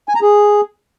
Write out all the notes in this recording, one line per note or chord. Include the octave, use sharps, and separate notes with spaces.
G#5
A#5
G#4